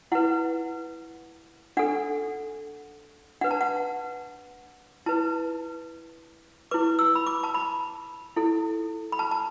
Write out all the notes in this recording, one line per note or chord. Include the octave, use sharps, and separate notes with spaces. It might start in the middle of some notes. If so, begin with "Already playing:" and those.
E4 B4 F#5
D4 A4 F#5
D4 B4 F#5
A5
F#5
E4 B4 A5
E4 B4 D6
E6
B5
D6
A5
B5
E4 A4
B5
A5
A5